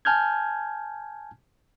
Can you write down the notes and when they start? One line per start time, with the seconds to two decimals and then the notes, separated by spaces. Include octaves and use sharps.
0.05 G#5 A5 F6 G6 G#6